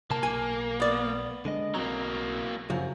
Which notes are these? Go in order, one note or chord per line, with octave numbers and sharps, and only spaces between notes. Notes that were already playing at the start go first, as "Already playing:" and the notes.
C3 A#3 A5
B1 G#5
B3 D5
D3 G#3 D#5
B1 F#3 A#3 C4 A#5
F#2 C#3 F3 F#4